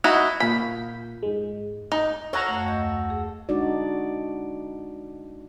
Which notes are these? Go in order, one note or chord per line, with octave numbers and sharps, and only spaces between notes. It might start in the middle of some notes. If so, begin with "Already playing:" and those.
D#4 E4 F#4
A#2 F5 B5 G6
G#2 G#3
D#4
F#4 A4 C#5 F5 F#5 A#5
F#2 A3
D#2 D#5 G6
G#4
G#3 D4 D#4 F#4 D5